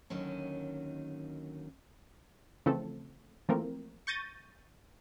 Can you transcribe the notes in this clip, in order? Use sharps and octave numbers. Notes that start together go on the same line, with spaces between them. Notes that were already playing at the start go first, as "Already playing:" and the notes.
D#2 D3 D#3 F#3 C#4
C#3 E3 F3 A3 C4 A4
E3 F3 A3 A#3 C4 A#4
C#6 G6 A6 A#6 D#7